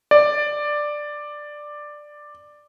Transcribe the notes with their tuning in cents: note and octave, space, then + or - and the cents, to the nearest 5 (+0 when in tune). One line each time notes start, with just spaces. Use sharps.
D5 +10